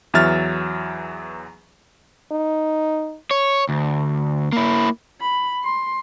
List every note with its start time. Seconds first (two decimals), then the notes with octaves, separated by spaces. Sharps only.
0.14 E2 E3 F#3 E5 F6 A6
2.32 D#4
3.31 C#5
3.69 D2
4.53 A#3 E4
5.21 B5
5.63 C6